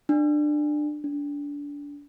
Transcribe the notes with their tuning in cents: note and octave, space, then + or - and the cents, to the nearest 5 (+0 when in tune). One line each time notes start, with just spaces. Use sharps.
D4 +20
D4 -25